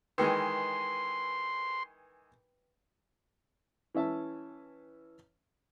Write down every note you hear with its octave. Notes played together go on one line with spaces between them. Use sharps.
D#3 E3 G#3 B4 G5 C6
E3 C#4 E5 A5